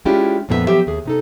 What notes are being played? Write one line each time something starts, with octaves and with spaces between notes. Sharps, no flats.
G#3 C#4 D4 E4 F4 G4
F2 A#2 B3 G#4 E5
F3 F#3 B3 G4 C5 E5
D#2 G#4
C3 D#4 A4